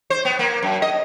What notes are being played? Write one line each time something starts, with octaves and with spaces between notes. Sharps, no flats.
C5
B3
A#3
F#2
D#5